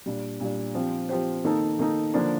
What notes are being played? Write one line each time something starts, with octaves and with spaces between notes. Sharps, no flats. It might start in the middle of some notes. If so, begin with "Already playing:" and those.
A#2 G3 D4
A#2 G3 D4
F3 C4 G4 C5
F3 C4 G4 C5
D#3 A#3 D#4 A4
D#3 A#3 D#4 A4
D3 F3 A#3 D4